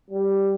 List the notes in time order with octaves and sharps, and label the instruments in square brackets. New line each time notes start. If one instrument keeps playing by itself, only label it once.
[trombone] G3